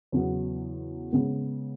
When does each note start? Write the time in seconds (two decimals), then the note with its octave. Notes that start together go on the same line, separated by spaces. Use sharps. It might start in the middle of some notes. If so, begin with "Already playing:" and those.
0.12 E2 C#3 F#3 B3
1.12 C#3 G#3 B3